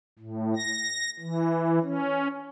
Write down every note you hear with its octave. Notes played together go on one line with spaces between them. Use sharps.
A2
A#6
E3
C#4